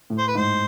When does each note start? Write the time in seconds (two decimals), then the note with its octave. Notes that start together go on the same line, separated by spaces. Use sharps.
0.10 A2
0.18 C5
0.28 B4
0.35 G#2 C5